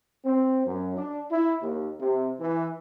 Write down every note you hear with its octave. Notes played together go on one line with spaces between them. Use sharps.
C4
F#2
D4
E4
D#2
C3
E3